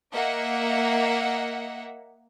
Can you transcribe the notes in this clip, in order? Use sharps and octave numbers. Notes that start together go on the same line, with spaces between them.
A#3 D#5 E5 F#5